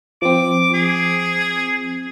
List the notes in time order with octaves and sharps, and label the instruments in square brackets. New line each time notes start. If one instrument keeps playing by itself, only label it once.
[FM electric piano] F3 C4 [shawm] D6
[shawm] G#4